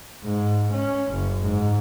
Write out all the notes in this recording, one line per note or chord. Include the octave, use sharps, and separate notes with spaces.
G#2
C#4
F#1
G#2